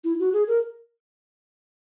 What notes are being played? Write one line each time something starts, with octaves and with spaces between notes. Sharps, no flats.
E4
F#4
G#4
A#4